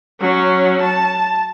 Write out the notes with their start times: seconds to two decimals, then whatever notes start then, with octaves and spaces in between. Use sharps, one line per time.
0.21 F#3 C#4
0.82 A5